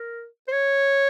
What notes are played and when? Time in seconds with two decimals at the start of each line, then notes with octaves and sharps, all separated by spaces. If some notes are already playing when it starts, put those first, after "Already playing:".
Already playing: A#4
0.48 C5
0.52 C#5